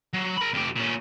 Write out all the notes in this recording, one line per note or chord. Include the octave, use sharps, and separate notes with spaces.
F#3
A#4 B5
F2 G4
A#2 C#4